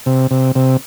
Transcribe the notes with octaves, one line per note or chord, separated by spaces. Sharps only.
C3
C3
C3